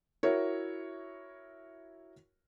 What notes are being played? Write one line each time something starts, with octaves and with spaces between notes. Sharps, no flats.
E4 F#4 A#4 C#5